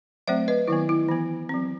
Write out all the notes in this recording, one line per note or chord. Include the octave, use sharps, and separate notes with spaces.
F#3 A3 C4 C5 E5
B4 D#5
D#3 F#3 B3 E4
E4
E3 B3
F#3 C4